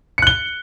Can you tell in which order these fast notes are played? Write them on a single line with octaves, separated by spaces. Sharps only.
C#7 F#6 G7